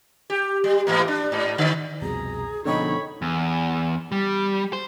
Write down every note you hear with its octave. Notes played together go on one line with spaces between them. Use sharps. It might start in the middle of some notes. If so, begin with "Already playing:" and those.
G4
G3
G#2 E3 A#3
D4
G#2
D3
C2 F2 B2 G#4 A#5
F2 B2 D3 D#4 A4 C#5 G5 B5
E2
G3
C5